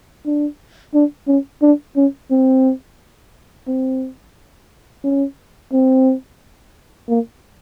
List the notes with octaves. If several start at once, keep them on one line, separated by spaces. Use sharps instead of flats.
D4
D4
C#4
D4
C#4
C4
C4
C#4
C4
A#3